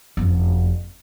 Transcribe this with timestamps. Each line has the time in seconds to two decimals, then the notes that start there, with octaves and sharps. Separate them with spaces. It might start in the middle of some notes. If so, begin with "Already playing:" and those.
0.17 F#1 F2